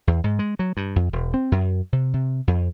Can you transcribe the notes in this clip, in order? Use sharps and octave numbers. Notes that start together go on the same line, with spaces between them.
E2
G#2
G#3
F#3
G2
F2
E1
C4
F#2
C3
C3
F2